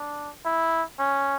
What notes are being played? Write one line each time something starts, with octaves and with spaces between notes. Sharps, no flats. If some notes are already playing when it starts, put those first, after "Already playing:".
Already playing: D4
E4
C#4